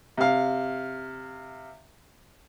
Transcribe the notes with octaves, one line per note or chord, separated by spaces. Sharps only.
C3 F5